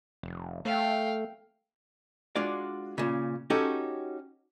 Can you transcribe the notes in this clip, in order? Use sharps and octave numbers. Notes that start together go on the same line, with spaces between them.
F1
A3 F5 G5
G#3 D4 F4 F#4 D5
A#2 C#3
C#4 D#4 F#4 G4 A4